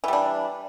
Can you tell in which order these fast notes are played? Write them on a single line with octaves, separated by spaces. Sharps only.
E3 G3 D4